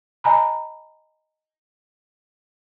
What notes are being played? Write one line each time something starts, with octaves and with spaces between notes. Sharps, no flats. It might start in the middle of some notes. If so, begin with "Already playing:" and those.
D#5 G#5 A#5 B5